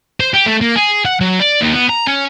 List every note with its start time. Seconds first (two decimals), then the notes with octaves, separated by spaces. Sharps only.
0.20 C5
0.34 G4
0.46 A3
0.61 A#3
0.76 G#4
1.05 F#5
1.21 F#3
1.39 D5
1.61 D#2
1.73 B3
1.89 A#5
2.07 C#4